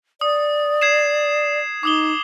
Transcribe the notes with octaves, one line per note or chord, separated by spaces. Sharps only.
D5 D#6
G#6 C7 E7
D#4 D6 D#6 G7